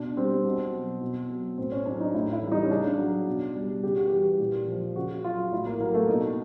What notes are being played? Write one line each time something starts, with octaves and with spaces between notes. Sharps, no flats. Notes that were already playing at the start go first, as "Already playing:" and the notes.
Already playing: B2 D4
G3 C4
B2
F#3
B2
F#3
A2 C4
C#4
F#3 D4
D#4
A2 E4
E4
E3 G3
D#4
C#4
C#3 D4
F#3
B2
G3
C#3 G4
F#4
E3 G3 G4
A#2
F3
C#3 F#4
F#3 F4
A2 E4
A#3
F#3 A#3
A3
B2 D#4